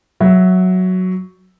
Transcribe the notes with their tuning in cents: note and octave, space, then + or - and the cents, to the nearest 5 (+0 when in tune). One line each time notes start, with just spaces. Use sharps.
F#3 +0 F#4 +0 E5 +0